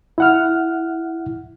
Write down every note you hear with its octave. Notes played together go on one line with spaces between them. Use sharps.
E4 F#5 F6